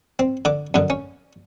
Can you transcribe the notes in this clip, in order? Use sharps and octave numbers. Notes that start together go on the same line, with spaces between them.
C4
D3 D6
F#2 B2 D3
C#4